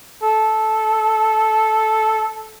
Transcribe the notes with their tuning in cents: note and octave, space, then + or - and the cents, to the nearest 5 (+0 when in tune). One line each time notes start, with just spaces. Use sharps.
A4 -10